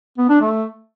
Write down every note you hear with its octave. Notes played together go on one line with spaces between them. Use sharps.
B3
D4
A3